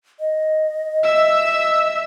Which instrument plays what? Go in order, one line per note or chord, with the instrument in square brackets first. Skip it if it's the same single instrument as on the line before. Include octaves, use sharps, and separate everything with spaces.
[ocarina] D#5
[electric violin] E5 E6